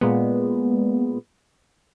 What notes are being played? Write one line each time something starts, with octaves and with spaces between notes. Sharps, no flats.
A#2 G#3 B3